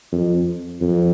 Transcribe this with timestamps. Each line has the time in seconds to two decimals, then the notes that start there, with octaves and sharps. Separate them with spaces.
0.12 F2
0.81 F2